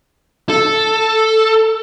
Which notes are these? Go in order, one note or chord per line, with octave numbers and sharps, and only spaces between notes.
A4